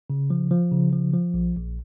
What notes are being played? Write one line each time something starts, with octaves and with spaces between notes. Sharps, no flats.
C#3
F3
F3
C#3
F3
F3
A#1
A#1